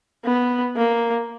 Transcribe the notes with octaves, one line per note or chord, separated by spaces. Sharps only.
B3
A#3